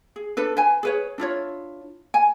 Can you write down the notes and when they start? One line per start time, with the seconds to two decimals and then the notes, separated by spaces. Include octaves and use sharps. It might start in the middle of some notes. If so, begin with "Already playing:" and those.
0.16 G#4
0.37 D4 A4 B4
0.57 B4 G#5
0.83 G#4 B4 C#5
1.18 D4 E4 F4 C#5
2.14 G#5